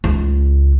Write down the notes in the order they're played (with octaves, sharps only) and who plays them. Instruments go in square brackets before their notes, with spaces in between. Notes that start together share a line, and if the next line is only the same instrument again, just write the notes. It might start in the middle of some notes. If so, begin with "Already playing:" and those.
[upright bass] C#2